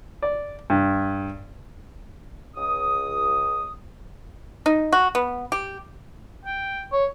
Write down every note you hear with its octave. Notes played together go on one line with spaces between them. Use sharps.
D5
G2
C#2 D#6
D#4
F#4
B3
G4
G5
C#5